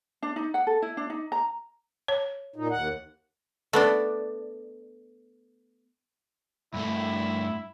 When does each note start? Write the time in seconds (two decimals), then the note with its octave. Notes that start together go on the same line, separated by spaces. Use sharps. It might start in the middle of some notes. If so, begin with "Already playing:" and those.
0.23 D4
0.36 D#4
0.54 F#5
0.67 A4
0.82 E4
0.97 D4
1.10 D#4
1.32 A#5
2.08 C#5
2.56 A#2 D#4
2.71 D#2 F#5
3.73 A3 B3 D4
6.74 G2 A3 E4